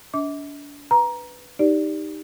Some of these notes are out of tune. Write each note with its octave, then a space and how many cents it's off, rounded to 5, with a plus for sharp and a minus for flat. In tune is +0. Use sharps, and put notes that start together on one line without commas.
D4 -35 E5 -45 D6 -20
B4 +0 A#5 +15
D#4 +0 G4 +5 D5 +0